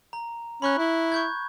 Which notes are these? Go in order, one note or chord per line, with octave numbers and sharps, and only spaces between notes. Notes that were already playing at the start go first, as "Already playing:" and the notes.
A#5
C#4 B5 C#6 F#6
E4
C#6 G6 G#6